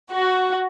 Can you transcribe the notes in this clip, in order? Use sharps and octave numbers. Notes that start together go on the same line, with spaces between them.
F#4